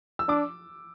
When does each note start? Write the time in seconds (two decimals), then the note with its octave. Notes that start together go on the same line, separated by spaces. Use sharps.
0.19 E6
0.28 D4 D6